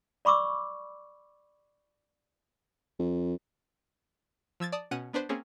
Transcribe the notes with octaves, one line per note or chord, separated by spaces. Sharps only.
D5 B5 C#6 D6 E6
F2
F3 E6 G#6 A6
D5 A5 D#6
B2 C#4 F#5 D#7
B3 D4 B4 C5
A#3 C4 C#4 G#4